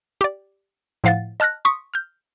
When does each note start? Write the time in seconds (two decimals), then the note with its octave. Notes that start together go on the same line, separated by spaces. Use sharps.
0.21 G4 D5
1.04 A2 F3 F5 F#5 A6
1.40 D#5 A5 F6 F#6 A#6
1.65 C6 C#6 D#6 B6 C#7
1.94 F6 G6